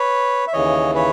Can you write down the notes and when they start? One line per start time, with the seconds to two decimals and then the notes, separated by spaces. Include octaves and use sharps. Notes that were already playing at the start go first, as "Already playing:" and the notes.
Already playing: B4 C#5
0.47 E5
0.53 D#2 C#3 E3 C#5 D#5
0.95 B4 C#5